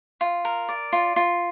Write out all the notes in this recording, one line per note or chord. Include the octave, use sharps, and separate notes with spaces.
F4
A#4
D5
F4
F4